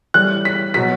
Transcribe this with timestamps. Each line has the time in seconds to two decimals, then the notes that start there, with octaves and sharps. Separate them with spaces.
0.14 A2 E3 G3 F#6
0.45 B6
0.74 B2 F#3 B6